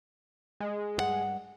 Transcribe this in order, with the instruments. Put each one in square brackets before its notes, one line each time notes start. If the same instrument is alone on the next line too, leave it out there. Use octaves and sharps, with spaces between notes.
[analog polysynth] G#3
[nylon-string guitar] G2 G4 F#5